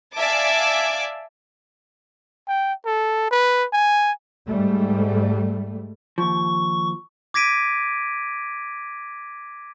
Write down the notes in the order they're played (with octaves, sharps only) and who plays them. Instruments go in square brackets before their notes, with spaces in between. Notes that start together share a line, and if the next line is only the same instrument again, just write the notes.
[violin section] D5 E5 F5 G#5 A5 D6
[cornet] G5
A4
B4
G#5
[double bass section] G#2 G3 A3
[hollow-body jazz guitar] D#2 F3 [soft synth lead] C#6
[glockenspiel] D6 G#6 A#6 B6 D7 D#7